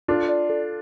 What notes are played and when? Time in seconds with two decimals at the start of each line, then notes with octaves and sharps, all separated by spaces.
0.08 D4 F4 A4
0.29 D5
0.49 A4